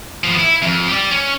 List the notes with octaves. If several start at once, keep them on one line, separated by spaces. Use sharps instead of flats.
F3 B3
E4
F2
G4 D5
C#4